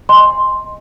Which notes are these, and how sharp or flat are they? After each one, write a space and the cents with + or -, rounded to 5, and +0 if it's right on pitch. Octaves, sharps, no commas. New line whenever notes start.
D#5 -5 G#5 -20 C6 +0